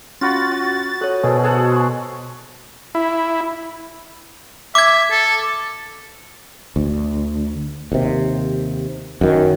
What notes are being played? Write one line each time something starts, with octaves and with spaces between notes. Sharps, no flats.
C#4 F4 F#4 B5 A6
F#4
A4 C#5 F#5
B2 G#4 A4 B4 C5
G#4 A4 F#5
C6 C#6
E4
E5 D6 G#6
A4
D2
D#2 C3
F#2 D#3